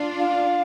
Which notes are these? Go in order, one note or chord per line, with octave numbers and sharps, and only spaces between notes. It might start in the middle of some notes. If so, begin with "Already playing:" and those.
Already playing: D4 F4
F5